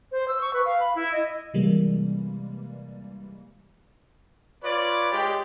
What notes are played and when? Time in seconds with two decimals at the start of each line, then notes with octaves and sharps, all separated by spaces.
0.12 C5
0.28 E6
0.41 C#6
0.54 B4
0.65 F5
0.80 B5
0.95 E4
1.12 D#5
1.54 C3 E3 G3 G#3 A#3
4.63 F4 B4 C#5 D5
5.12 G#3 G4